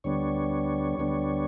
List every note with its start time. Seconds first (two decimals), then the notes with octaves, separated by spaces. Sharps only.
0.04 D2 D3 G3 B3 D4 C#5
0.98 D2 D3 G3 B3 D4